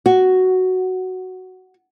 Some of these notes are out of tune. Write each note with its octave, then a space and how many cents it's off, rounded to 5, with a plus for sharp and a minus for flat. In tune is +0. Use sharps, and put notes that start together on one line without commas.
F#4 +5